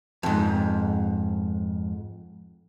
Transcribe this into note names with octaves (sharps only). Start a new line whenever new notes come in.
F2 G#2